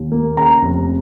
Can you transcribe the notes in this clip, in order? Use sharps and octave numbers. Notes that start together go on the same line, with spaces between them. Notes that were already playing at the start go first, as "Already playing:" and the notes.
Already playing: D#2
A#3
C#3 A#5
F1